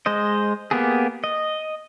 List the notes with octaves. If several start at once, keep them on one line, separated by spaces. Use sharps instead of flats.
G#3 C5 D#5
A#3 B3 G4 G#4
D#5